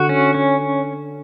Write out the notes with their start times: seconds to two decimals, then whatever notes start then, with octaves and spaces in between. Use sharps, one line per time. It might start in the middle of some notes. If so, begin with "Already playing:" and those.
Already playing: D3 F#4
0.09 C#4
0.34 C#4